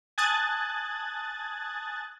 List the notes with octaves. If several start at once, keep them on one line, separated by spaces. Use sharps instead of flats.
G#5 A5 D#6 F#6 G#6 A6